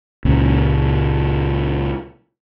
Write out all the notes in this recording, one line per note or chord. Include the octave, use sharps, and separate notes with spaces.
C#2 A#2 C#3